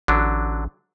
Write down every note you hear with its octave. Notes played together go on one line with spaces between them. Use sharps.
A1 D3 F#3 D4